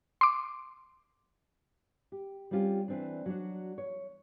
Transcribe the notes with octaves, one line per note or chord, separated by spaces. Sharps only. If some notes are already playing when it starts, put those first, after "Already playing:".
C6 D6
G4
G3 C4 C#4 F4 G4
E3 C4 D4
F#3 D4 F#4
C#5